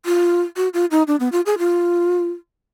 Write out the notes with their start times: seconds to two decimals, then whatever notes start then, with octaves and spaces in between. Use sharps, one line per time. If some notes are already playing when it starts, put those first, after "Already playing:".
0.06 F4
0.56 F#4
0.74 F4
0.91 D#4
1.07 D4
1.20 B3
1.32 F4
1.46 G#4
1.58 F4